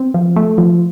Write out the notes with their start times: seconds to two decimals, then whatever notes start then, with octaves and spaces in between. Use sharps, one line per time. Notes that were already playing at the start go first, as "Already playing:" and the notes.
Already playing: C4
0.14 F3
0.36 A3
0.58 F3